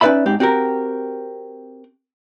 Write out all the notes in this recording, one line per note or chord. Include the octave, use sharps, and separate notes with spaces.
C#4 D#4 B4 D5 E5 B5
G#2 C4 G4
C4 F#4 G4 A#4